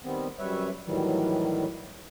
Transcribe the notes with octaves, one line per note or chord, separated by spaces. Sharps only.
D#3 G3 B3 C4
F#2 G3 B4 C#5 E5
A2 D#3 E3 F#3 G3